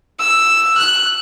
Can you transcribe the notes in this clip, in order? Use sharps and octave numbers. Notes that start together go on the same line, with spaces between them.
E6
F#6